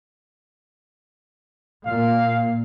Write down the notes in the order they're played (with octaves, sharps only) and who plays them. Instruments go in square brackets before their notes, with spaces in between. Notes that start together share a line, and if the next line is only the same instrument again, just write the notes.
[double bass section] A#2 [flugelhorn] F5